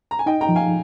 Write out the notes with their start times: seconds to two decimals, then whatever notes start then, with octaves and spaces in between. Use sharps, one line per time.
0.11 A#5
0.19 G#5
0.26 D#4 D#5 G5
0.41 G5 A#5
0.49 F3
0.55 F5 G#5